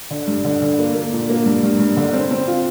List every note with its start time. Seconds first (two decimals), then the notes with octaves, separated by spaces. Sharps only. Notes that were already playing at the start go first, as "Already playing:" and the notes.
0.10 D3
0.27 G2
0.44 D3
0.62 D3
0.79 A#3
0.95 A#3
1.12 A#2
1.29 A#3
1.46 G2
1.63 G2
1.79 G2
1.97 D3
2.13 C4
2.31 C4
2.47 F4